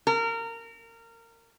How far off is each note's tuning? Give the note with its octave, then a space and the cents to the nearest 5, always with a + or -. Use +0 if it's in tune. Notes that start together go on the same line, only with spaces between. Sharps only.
A#4 -25